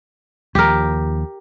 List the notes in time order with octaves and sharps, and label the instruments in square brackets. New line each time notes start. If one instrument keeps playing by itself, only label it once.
[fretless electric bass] D#2 F3 [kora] G4 A#4